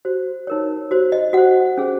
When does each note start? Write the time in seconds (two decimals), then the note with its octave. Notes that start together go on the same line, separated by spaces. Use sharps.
0.05 F#4 C5
0.47 D#4 A#4 C#5
0.91 F#4 C5
1.12 D#5
1.33 F#4 C5 F#5
1.77 C#4 G#4 C5